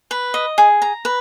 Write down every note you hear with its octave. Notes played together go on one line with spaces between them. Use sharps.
B4
D#5
G#4
A#5
B4